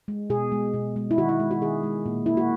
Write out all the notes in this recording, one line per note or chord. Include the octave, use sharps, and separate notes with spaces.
G#3
B2 G#4
G#3
B2
G#3
E4
D#3 F#4
E4
G#3
F#4
D#3 G#4
G#3
A#2
A#3 E4
F#4